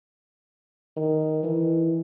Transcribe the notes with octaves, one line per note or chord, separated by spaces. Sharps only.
D#3
E3